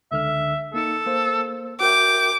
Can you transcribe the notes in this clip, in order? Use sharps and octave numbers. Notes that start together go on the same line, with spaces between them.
C#2 D3 E5 F6
A#3 D#4 A4 C#7
A#3 C5
F#4 A#4 E5 G5 D6